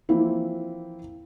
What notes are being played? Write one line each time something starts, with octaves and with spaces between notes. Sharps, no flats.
E3 F3 A#3 C4 E4